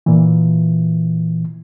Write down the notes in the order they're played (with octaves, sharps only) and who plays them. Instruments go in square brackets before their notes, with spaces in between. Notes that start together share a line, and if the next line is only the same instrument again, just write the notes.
[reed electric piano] A#2 E3